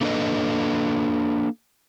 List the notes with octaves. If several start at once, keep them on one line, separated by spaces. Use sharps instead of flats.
A3 A#3 D4 A4 B4 D#5